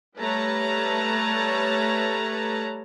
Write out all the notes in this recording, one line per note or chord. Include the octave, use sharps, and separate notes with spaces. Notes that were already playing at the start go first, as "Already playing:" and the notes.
G3 A3 B4 C#5 A5 A#5